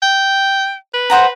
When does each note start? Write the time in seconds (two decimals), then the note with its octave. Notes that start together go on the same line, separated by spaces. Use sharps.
0.02 G5
0.94 B4
1.10 C5 F#5 A#5